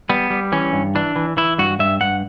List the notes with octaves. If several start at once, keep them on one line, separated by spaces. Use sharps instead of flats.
G3 B3
G3
E3 C#4
G2
E3 D4
E3
E3 E4
G2 F#4
G2 E5
G2 F#5